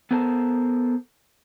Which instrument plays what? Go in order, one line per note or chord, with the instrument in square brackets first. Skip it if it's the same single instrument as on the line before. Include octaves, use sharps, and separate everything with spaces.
[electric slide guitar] B3 A4 A#4 C5 A5